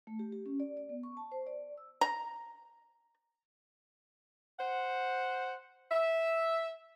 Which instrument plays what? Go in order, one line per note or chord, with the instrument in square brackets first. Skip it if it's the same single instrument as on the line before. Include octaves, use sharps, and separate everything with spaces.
[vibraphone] A3
G4
G4
C#4
D5
D5
B3
C#6
A5
C5
D5
E6
[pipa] A#5
[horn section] C5 F#5
E5